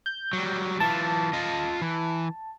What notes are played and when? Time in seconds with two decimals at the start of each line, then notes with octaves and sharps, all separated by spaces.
0.06 G6
0.33 F#3 G3
0.80 E3 F4 A5
1.33 F4 D#5
1.82 E3